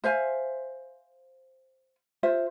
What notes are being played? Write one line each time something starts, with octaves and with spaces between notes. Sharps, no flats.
C5 E5 F5 G#5
F4 C5 E5